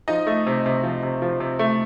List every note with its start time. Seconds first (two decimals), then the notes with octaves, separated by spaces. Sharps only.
0.08 F3 D#4 D#5
0.27 A3
0.47 C3
0.66 C3
0.83 F3
1.03 C3
1.22 F3
1.40 C3
1.59 A3